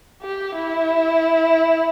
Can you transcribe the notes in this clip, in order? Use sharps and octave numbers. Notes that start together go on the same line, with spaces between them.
G4
E4